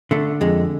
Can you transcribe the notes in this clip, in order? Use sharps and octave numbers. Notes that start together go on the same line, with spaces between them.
D3 A3
F2 G#3